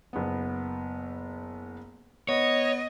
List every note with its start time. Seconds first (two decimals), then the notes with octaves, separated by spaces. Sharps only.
0.13 F#1 B3
2.29 B3 C#5 D#5